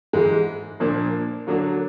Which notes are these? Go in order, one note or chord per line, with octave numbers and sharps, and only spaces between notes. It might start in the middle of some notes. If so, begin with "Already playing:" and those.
G#2 E3 G#3
A#2 F3 A#3 D4
D3 F#3 A#3 D4